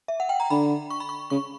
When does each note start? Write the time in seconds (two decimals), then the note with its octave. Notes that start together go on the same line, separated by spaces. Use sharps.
0.08 E5
0.20 F#5
0.29 G5
0.40 A#5
0.50 D3 B5
0.91 C#6
1.00 B5
1.09 C#6
1.30 C#3 C#6